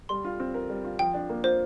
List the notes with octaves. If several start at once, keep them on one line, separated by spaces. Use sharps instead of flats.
G3 C6
F4
C4
A#4
G3
F4
F3 G5
D4
A#3
F4 C5